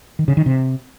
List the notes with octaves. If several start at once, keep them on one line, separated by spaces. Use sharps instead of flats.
D#3
C#3
D#3
C3